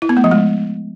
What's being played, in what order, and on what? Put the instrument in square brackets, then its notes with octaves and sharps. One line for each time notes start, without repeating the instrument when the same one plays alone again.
[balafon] E4
B3
A3
F3
G#3